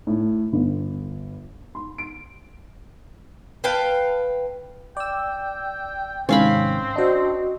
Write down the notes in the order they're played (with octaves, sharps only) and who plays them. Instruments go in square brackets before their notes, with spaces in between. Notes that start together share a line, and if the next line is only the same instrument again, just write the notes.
[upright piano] A2
G1
C6
D7
[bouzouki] B4 F5 G5 A5
[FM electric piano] D5 E6 [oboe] G5
[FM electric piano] G#2 C3 D#3 [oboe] C4 [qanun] C#4 F5 B5
[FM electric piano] D4 C5 [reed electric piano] F#4 D#5